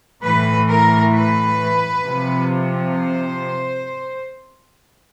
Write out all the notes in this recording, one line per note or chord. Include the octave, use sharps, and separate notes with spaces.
A2 E3 B4
A#4
B4
C3 F3
C5